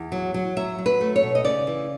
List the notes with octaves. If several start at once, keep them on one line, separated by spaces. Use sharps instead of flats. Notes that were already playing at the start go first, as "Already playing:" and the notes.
Already playing: E2
F#3
F#3
F#3 E5
F#3
B4
A3
C#5
B2
D#5
C#3 D5
E3